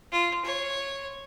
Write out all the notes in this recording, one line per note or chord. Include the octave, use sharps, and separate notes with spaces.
F4
C#5